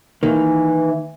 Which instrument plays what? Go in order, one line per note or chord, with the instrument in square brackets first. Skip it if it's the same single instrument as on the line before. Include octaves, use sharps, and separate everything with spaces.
[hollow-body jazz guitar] D#3 A#3 [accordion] E3